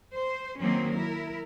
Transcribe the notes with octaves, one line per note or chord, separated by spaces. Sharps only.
C5
D#3 F#3 A#3 C4 C#4
E4 A#4